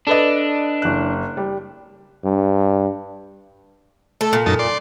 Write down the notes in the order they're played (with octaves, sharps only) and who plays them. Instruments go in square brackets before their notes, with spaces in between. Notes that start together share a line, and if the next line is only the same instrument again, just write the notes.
[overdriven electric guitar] D4 [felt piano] A4 B4 D#5
[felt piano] F#1 F#6
G3
[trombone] G2
[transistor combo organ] A3 [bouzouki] A4
[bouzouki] A#2
[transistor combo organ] F#2 D#4 A5
D5 C6